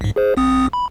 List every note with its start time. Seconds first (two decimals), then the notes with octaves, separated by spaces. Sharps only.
0.01 B1 G#2
0.16 G#4 C5
0.37 A#1 C4 D#6
0.73 B5